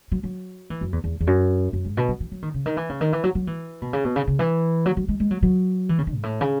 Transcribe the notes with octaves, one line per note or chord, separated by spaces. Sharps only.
F#3
F#3
E3
F#2
E2
E2
E2
F#2
F#2
G#2
B2
F#3
E3
F#3
D#3
C#3
D#3
E3
C#3
D#3
E3
F#3
F#3
E3
B2
C#3
B2
C#3
C#3
E3
F#3
F#3
G#3
G#3
F#3
F#3
E3
C#3
D#3
G#2
A2
C#3